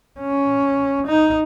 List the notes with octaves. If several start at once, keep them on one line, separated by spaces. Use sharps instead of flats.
C#4
D#4